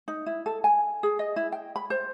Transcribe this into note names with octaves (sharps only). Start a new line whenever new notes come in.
D#4
E4
A4
G#5
G#4
D#5
E4
G5
B5
C5